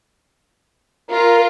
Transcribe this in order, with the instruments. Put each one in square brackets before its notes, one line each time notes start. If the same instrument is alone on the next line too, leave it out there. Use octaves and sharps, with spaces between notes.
[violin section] F4 [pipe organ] A#4